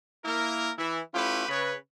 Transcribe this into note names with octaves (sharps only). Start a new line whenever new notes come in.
A#3 E4 A#4
E3 E4
A3 C#4 E4 F4 G4 B4
C#3 B4 C#5